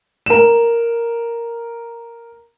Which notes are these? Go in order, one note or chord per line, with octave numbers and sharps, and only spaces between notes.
A#4 E7